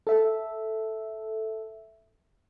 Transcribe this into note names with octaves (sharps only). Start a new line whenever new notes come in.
A4 E5